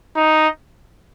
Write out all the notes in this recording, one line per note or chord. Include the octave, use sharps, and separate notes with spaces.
D#4